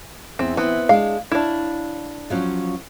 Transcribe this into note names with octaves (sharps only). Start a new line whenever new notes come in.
E2 C4
E3 B3 C4
G#3 D4 F5
D4 E4 C#5 F5
F3 F#3 C#4